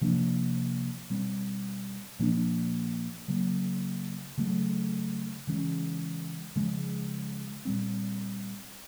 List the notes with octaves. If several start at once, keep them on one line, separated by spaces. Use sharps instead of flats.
C3 F3 A#3 D4
B2 G3 C4
A#2 F3 A#3 D4
C#3 F#3 A#3
C#3 F#3 A3
C#3 E3 G#3 C#4
C#3 F3 G#3
A#2 G3 C4